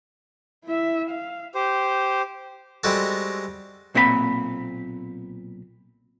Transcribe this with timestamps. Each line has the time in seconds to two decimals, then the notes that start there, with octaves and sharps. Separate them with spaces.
0.64 E4 E5
1.10 F5
1.55 G4 C5
2.84 G3 G#3 C4 F#4 A4
3.95 B1 A#2 C4 A4 B5